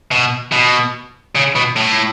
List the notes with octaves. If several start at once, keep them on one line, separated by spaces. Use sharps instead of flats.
B2
B2
C#3
B2
A2